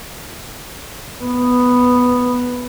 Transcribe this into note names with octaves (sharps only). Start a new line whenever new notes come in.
B3